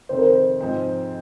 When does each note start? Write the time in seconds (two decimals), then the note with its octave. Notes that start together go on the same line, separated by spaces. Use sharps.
0.09 F2 C3 D#3 C5
0.18 A#4
0.27 C5
0.59 G#2 F3 G#3 C4 D#4